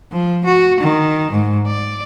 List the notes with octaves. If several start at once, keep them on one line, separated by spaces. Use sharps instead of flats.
F3
F#4
D#3
G#2
D5